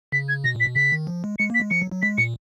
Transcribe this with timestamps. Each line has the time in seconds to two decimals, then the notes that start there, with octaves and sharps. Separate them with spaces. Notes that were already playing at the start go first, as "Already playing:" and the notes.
0.12 C#3 B6
0.29 G#6
0.44 B2 A#6
0.55 A#2
0.60 B6
0.65 B2
0.75 C#3 B6
0.92 D#3
1.07 F3
1.24 G#3
1.39 G#3 C#7
1.50 A#3 B6
1.60 G#3
1.71 F3 C#7
1.82 F#3
1.92 F#3
2.02 G#3 B6
2.18 A#2 C#7